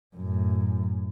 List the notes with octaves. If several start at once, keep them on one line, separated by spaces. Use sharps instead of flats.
F#2 A2